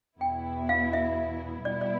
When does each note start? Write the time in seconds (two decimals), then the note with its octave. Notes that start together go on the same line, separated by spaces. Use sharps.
0.21 E2 B2 B3 E4 G5
0.69 F5
0.93 E5
1.65 B2 G3 B3 E4 D5
1.81 D5